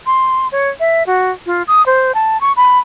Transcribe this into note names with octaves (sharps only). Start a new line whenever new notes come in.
C6
C#5
E5
F#4
F4
D#6
C5
A5
C#6
B5